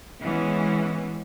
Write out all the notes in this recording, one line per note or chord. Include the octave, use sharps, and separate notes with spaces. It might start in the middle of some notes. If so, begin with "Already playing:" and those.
E3 G#3 B3 C#4